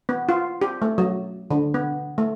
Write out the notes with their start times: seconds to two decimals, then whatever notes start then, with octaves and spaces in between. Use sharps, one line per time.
0.09 B3
0.29 F4
0.62 G4
0.82 A3
0.98 F#3
1.51 D3
1.74 B3
2.18 A3